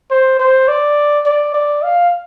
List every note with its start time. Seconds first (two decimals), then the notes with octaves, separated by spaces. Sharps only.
0.10 C5
0.39 C5
0.68 D5
1.25 D5
1.54 D5
1.83 F5